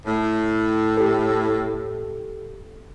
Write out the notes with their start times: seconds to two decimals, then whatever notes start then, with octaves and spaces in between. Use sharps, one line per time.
0.06 A2
0.97 G4 A4